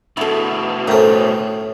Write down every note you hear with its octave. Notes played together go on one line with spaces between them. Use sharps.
D2 B2 E4 A4
A2 C#4 A4 A#4 C5 E5